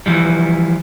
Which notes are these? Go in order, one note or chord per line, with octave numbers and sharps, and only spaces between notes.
E3 F3 G3